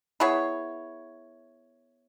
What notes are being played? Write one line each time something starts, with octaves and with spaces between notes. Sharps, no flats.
B3 E4 G#4 C#5